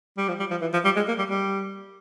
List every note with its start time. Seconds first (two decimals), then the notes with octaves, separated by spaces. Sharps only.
0.17 G3
0.28 F3
0.39 G3
0.51 F3
0.61 E3
0.73 F3
0.84 G3
0.96 G#3
1.08 A#3
1.18 G3
1.30 G3